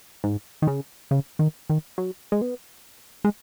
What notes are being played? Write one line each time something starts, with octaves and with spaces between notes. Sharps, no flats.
G#2
D#3
C#3
C#3
D#3
D#3
F#3
G#3
B3
G#3